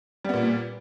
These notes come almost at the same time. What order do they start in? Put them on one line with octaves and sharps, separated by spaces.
G3 B3 A#2